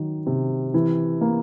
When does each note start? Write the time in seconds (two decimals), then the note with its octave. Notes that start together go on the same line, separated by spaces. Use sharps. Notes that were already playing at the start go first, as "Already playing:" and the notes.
Already playing: D#3 F#3
0.26 C3
0.74 E3
1.21 A#3